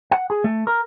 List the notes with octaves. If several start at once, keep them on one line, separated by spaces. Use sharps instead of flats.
F#5
G#4
A3
A#4